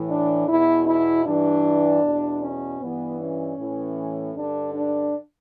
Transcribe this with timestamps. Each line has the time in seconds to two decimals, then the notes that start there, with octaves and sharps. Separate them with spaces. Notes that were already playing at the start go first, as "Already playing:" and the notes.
Already playing: A2 E3
0.08 D4
0.47 E2 B2 E4
0.86 E4
1.24 G2 E3 D4
2.02 E2 B2
2.41 C#4
2.79 G2 E3 B3
3.19 C#4
3.58 A2 E3
4.35 G2 D3 D4
4.74 D4